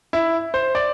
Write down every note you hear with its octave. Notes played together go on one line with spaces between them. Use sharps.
E4
C5
D5